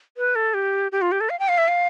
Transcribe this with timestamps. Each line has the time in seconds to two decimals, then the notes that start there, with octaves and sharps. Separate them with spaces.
0.17 B4
0.35 A4
0.54 G4
0.92 G4
1.02 F4
1.12 G4
1.21 A4
1.30 F5
1.39 G5
1.48 F5
1.58 E5
1.68 F5